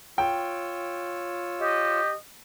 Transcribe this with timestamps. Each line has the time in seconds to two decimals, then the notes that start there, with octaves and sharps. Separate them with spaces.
0.18 F4 C#5 G5 E6
1.61 G4 D#5